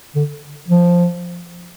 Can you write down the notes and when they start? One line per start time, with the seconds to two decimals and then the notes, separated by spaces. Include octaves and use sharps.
0.15 D3
0.68 F3